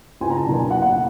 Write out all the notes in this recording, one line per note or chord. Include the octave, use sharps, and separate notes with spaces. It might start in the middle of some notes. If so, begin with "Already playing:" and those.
C#2 G#5
A#5
A5
B2 F#3 A#3 D4
G#5
F#1 F#5
F#5